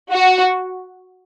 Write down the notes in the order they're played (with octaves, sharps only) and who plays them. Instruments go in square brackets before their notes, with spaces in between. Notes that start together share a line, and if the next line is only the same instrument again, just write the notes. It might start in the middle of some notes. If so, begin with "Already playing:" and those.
[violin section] F#4